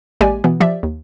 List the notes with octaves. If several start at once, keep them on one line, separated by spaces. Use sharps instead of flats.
A1 G#3 A#3 G4 D5 G#5
B2 E3 B3
F3 G4 D5 E5
D#2